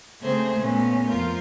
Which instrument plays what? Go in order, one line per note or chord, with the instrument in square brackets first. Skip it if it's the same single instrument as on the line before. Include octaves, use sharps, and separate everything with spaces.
[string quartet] C#3 A3 A#3 C4 G#4 C5
A#2 A3 B3 C#4
F2 F4 A#4 G6